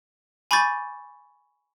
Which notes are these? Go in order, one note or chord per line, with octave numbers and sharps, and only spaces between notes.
G#5 B5 C#6 D6 G6 A6